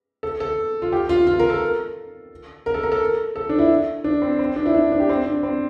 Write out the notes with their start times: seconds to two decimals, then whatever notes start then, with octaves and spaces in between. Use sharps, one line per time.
0.23 A4
0.40 A4
0.82 F4
0.92 G4
1.09 F4
1.27 F4
1.39 A#4
1.50 A4
2.66 A#4
2.74 A4
2.83 A#4
2.92 A4
3.36 A4
3.49 D4
3.59 E4
4.04 D4
4.22 C4
4.39 C4
4.56 D4
4.66 E4
4.74 D4
4.92 D4
5.00 G4
5.09 C4
5.26 D4
5.43 C4